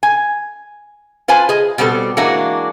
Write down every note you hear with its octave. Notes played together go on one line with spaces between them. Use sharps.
G#5
F4 B4 C5 G#5 A5
G#4 D#5
B2 G3 B3 C4 A4
E3 G#3 A#3 D4 F#4